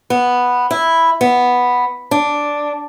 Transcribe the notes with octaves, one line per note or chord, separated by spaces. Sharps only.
B3
E4
B3
D4